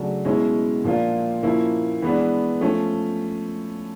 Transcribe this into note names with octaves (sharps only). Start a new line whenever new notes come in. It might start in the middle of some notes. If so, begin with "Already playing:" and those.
Already playing: C#3 F#3 A3 D4
B2 G#3 C#4 E4
A#2 F3 A#3 D4 F4
A#2 F3 A#3 C#4 E4
E3 G#3 B3 D4
F3 A3 C#4